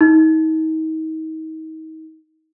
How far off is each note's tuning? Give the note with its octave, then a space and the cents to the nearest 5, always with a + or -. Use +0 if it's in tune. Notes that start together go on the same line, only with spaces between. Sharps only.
D#4 +35